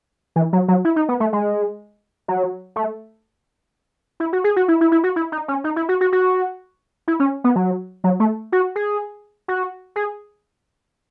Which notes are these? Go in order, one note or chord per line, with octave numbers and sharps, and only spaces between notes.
E3
F#3
F#3
E4
D#4
B3
A3
G#3
F#3
A3
E4
F#4
G#4
F#4
E4
E4
E4
F#4
E4
D#4
C#4
D#4
E4
F#4
F#4
F#4
E4
C#4
B3
F#3
F#3
A3
F#4
G#4
F#4
G#4